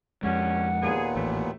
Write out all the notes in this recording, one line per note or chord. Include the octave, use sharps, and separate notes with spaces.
F2 D#3 G3 G#3 C#4 F#5
D#2 A#2 B3 G#4
A1 C3 F#3 A3